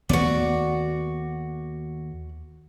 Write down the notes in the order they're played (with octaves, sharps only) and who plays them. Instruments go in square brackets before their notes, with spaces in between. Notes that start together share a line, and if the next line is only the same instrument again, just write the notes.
[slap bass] D#2 A3 B3 [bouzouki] F#4 D5